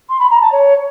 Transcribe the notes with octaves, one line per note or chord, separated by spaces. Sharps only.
C6
B5
A#5
A5
C#5